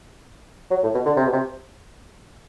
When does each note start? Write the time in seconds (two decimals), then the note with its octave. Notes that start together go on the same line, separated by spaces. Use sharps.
0.71 F#3
0.83 A2
0.94 B2
1.06 D3
1.17 C3
1.27 B2
1.33 C3